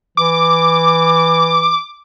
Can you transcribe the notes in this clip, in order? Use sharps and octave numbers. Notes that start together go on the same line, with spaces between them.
E3 D6